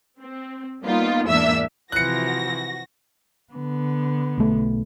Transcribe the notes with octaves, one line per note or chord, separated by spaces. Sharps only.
C4
G3 A#3 B3 D#4 F4
E2 G#2 A#3 D4 E5 E6
C3 E3 F3 F#4 F#6 A#6 C#7
D3 B3
B1 A3